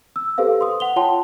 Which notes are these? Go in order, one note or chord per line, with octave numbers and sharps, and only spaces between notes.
E6
G4 A4 B4 C5 F5
C6 D#6
F#5 F7 G7
F4 C#5 F#5 G5 A5 C6